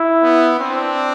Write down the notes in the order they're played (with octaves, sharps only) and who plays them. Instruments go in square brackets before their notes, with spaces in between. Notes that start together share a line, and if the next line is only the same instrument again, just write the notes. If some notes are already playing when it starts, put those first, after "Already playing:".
Already playing: [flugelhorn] E4
[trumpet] B3
[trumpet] C4 [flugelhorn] D4